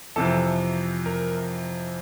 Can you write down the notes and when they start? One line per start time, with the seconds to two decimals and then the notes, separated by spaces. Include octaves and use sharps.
0.16 F2 C3 E3 A4
1.06 A#4